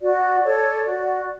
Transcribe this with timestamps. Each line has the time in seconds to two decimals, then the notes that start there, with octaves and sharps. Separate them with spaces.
0.02 F#4 D5
0.44 A4 C#5
0.86 F#4